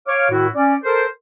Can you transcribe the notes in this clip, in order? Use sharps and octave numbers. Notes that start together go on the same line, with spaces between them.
C#5 F5 D6 F6
A2 D#3 E4 F#4
C#4 D5
A4 A#4 C5